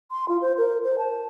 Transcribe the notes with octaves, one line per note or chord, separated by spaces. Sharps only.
C6
F4
C5
A#4
C5
A5